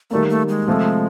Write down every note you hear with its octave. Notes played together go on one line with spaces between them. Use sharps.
D#3 G3 A3 A#3
A3
G#3
C3 F3 A3